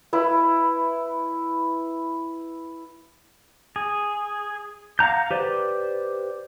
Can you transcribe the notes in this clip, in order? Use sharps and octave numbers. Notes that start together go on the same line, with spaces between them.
E4 B4
G#4
F5 F#5 A#5 G6
G4 B4 C5 D5